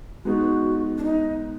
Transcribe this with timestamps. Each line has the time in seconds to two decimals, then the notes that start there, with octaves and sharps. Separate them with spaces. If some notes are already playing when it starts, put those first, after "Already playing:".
0.25 G#3 B3 D#4 F#4
0.98 D4
1.04 D#4